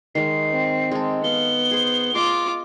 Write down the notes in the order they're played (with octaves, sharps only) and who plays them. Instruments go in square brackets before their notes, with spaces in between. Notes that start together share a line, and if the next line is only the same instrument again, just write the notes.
[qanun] D#3 G#3 [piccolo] C7
[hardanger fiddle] C4
[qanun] G#3 A4
[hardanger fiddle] B3 [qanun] F5 [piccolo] G7
[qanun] G#4 C5
[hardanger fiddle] F4 D6 [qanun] D#5 C6